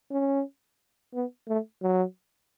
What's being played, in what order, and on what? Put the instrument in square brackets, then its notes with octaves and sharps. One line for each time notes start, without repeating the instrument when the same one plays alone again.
[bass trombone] C#4
B3
A3
F#3